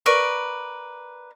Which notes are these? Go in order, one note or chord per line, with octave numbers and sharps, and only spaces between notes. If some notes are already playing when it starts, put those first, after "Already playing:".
A#4 B4 D5 C#6